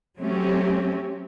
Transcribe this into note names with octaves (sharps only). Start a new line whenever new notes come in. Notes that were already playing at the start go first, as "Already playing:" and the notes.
F#3 A3 C4 C#4 G4